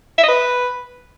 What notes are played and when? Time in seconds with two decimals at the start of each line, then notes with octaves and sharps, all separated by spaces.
0.18 E5
0.23 D#5
0.28 B4